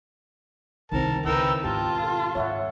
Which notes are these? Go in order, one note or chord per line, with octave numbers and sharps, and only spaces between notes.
C2 B2 D#3 C4 A#4 A5
C#2 E4 A#4 B4 G5 E6
G#2 B2 F4 G4 A5
A4
G#2 G3 C#5 E5 F#5